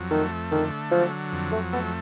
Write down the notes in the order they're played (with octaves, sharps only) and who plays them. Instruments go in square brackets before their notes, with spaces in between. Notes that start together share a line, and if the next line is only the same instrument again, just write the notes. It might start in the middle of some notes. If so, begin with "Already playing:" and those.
Already playing: [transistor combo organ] F2 F#3
[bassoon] D#3 [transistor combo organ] A3
[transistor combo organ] D3 [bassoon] D#3
[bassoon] F3 [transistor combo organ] F#3
[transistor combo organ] F2
[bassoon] A3
[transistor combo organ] A3 [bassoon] B3